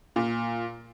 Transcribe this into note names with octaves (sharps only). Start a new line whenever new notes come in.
A#2